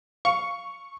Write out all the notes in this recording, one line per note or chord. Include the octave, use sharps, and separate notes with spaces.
F5 C#6